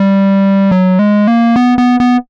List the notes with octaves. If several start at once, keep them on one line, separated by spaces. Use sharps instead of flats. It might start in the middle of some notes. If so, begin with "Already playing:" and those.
Already playing: G3
F#3
G#3
A#3
B3
B3
B3